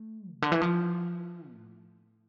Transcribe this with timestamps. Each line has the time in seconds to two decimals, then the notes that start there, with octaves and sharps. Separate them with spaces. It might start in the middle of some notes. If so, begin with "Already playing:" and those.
Already playing: A3
0.33 C3
0.42 D3
0.52 E3
0.62 F3
1.51 A2